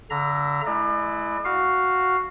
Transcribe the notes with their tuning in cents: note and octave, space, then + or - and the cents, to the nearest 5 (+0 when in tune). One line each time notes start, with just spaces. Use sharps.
D3 -30 E5 +25 A#5 +0
G#3 +40 E4 +0 D5 +40
F#4 +0 F5 +0